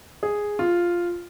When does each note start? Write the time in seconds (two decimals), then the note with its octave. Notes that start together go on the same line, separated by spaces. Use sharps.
0.23 G#4
0.59 F4